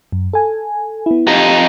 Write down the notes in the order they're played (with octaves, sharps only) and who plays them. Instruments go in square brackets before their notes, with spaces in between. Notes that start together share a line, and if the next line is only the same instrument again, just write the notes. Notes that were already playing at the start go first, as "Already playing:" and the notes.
[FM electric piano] F#2
A4 G#5
B3 E4
[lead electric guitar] F2 D#4 [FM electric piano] G4